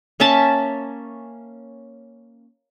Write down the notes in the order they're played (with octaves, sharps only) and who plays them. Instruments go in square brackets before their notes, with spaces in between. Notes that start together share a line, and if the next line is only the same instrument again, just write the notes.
[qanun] A#3 C#4 E5 A5